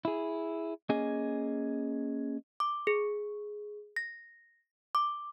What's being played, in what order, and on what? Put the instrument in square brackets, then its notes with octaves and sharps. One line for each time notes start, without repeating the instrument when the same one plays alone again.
[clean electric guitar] E4 G#4
A#3 C#4 G#4 D#5 G#5
[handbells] D6
G#4
A#6
D6